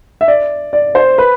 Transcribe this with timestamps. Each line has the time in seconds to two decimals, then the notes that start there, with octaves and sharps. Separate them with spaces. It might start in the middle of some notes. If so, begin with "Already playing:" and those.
0.21 E5
0.28 D5
0.73 D5
0.95 C5
1.18 B4